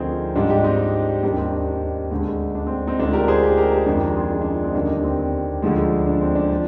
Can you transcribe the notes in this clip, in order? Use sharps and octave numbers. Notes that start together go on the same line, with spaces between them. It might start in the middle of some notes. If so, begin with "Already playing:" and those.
Already playing: D2 D3 F3 C4 D#4 F4 G#4 A#4
G#2 G3 D4 F4
D#4 G4
C4 D#4
D#2 D#3 G3 D4
C4 D#4
D4
D4
D2 D3 G#3
D4
C4
C4 D#4
D2 D3 G#3 D4 F4
G4 A#4
G#4 C5
G4 A#4
G4 A#4
D#4 G4
F2 D#3 G#3 D4
F4 G#4
D4 F4
D4
C4
D#4
D#2 D3 G3 D4
D#4
D4
C4
C4
D2 D3 F3 G#3
D4
C4
D4
F3